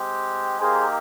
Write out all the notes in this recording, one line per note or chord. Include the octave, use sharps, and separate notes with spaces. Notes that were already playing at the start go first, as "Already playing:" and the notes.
Already playing: G#3 C4 G4
A#3 D#4 G4 G#4 C5